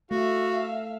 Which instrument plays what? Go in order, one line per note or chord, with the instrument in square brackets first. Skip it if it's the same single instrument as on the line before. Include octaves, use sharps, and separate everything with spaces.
[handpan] A3 [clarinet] F#4 [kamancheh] E5 F5